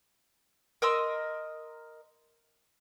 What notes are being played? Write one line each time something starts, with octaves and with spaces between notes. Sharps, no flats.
A#4 D#5 C6 E6